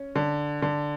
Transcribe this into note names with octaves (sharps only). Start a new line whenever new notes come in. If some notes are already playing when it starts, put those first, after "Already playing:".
Already playing: C#4
D3
D3